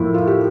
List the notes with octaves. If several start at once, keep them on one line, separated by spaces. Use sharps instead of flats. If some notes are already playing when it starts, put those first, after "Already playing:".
Already playing: A2 F3 A#3 E4 F4
F4
G4